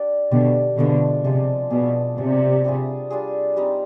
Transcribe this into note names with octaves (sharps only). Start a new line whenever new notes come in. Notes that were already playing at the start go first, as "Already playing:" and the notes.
Already playing: D4 G4 D5
B2 D3 D4 G4 D5
B2 D3 F3 G#3 D4
C3 F3 G#3 D4
B2 D4 G#4 D5
C3 D4 G#4 D5
G3 D4 F4 G#4
G3 D4 F4 G#4
G3 C4 D#4 G4